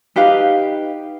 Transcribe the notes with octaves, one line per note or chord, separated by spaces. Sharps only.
D#4 G4 B4 F5